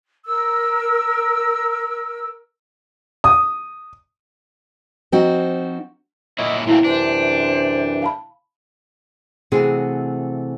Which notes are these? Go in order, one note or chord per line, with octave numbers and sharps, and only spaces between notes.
A#4 E6
D#6
F3 C4 D#4 F#4
A#2 F#3 E4 C#5 D#5 E5
A#2 E3 F#3 A3 C4 E4 F5
F#2 C3 E3 D4 C5
F5 A5 B5
C3 E3 A3 C4 F#4 G#4